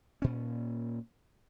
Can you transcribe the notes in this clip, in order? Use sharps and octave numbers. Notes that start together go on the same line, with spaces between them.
A#2 C#4